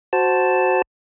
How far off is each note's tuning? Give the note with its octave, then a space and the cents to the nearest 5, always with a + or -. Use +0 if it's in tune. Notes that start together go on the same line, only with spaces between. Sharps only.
F#4 +0 C5 +0 A5 +0